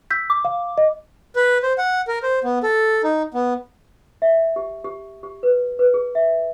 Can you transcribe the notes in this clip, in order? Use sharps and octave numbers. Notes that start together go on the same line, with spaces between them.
E6 G6 B6
D6
F5
D#5
B4
C5
F#5
A#4
C5
B3
A4
D#4
B3
E5
G4
G4
G4
B4
B4
G#4
E5